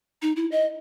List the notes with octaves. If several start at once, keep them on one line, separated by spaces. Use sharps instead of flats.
D#4
E4
D#5